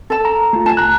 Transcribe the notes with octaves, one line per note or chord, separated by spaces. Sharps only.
A4 A5
A#5
A3 F4
G#5 A5
C#2 A#5 F#6